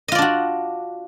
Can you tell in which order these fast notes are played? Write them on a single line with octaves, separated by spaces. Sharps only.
D#5 F4 D5 D4 F#4